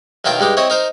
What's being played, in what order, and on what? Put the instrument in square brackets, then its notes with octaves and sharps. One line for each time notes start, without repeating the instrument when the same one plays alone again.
[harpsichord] B1 D#3 E4 F4 A#4 G5
G2 G#3 D#4 G4
C4 E4 C#5 D#5
D#4 A#4 C5